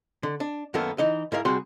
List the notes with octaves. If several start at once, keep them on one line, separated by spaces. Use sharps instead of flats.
D3
D4
F#2 D#3 A#3 B3 A4 A#4
E3 D#4 D#5
G#2 E4 A#4 F5
C3 G3 F#4 G#4 C6